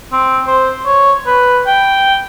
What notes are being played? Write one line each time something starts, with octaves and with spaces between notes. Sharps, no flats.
C4
C5
C#5
B4
G5